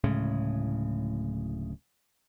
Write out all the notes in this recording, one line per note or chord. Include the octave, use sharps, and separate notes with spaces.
D1 A2 C#3 G#3